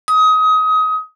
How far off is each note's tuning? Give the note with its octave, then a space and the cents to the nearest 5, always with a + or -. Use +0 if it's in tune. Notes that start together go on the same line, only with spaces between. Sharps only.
D#6 +25